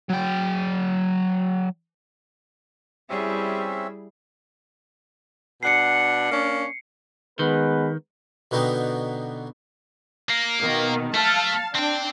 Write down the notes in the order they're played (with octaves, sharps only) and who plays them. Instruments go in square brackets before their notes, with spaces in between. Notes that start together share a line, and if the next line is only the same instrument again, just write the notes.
[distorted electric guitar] F#3 G5
[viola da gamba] G3 E4 G#4 [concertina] C4 C#4 E5
[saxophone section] B2 D4 F#5 [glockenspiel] C7 C#7
[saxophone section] A#3 C#4 D4
[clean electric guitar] D#3 [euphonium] G#3 [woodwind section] B3 B4
[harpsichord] B2 D3 B3 D#4 G5
[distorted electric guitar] A#3
[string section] B2 D#3
[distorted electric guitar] A3 [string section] F5 A5
[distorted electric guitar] C4 G5 [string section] D4